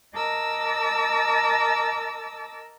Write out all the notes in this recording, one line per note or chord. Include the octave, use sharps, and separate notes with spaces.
A#4 D#5 A5 D6 E6